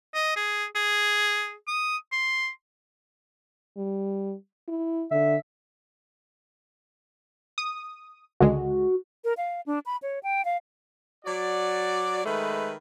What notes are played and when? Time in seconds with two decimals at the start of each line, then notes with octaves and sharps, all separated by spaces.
0.15 D#5
0.36 G#4
0.75 G#4
1.68 D#6
2.12 C6
3.77 G3
4.68 E4
5.11 D3 E5
7.58 D#6
8.40 C#2 D3 G#3 F#4
9.24 A#4
9.37 F5
9.66 D4
9.86 B5
10.03 C#5
10.23 G5
10.45 F5
11.25 F#3 F#4 D5
12.25 D#3 G#3 A3 B4